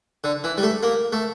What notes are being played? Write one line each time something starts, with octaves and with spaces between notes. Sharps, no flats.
D3
E3
G3
A3
A#3
A3